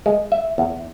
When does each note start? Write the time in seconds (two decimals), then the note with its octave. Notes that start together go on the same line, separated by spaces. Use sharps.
0.06 G#3
0.32 E5
0.58 E2